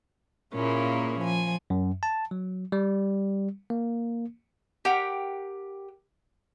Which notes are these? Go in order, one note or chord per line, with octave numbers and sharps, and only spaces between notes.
A#2 A#3 C#4 E4 G#4
F3 G#5
F#2
A5
F#3
G3
A#3
G4 A#4 F#5 G5